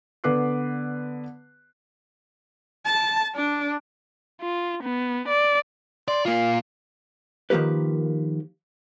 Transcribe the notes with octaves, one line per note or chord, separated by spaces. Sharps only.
D3 B3 B4 D6 F#6 C7
A5
D4
F4
B3
D5
D5 C6
A#3 F4 F5
D#3 F3 A#3 G4 B4